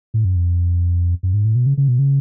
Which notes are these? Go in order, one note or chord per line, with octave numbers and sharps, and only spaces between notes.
A2
F#2
F2
F#2
G#2
A2
B2
C#3
C#3
B2
C#3